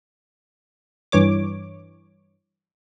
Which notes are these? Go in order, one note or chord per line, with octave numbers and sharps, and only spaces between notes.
G2 E3 C#5 D6